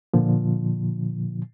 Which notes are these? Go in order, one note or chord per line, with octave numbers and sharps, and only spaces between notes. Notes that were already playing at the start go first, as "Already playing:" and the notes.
A#2 D3 F3